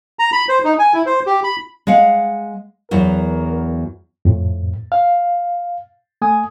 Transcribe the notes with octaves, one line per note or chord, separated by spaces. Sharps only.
A#5
B5
C5
D#4
G#5
E4
C5
G4
B5
G#3 F5 F#5
E2 F#3 E4 A#4
F2 A2
F5
A3 G#5 D#6